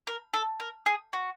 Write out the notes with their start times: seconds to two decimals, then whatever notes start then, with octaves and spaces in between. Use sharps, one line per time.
0.07 A#4
0.34 A4
0.60 A#4
0.86 G#4
1.13 F#4